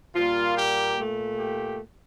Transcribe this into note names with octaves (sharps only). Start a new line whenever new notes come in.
A#2 G3 A#3 F4
G4
A#2 A3
G4